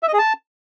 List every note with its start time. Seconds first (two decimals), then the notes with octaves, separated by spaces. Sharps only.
0.03 E5
0.08 D#5
0.13 G#4
0.18 A5